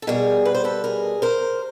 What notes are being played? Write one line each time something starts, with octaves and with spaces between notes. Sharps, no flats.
A4
B2 G3 G#4 A#4
B4
C5
A4 B4
G#4 A#4
A#4 C5